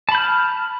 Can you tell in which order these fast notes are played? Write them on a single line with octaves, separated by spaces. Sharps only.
A5 B5 G6 F6